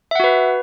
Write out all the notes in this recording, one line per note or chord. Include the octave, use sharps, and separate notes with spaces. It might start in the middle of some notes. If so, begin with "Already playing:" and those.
F#4 B4 E5 F#5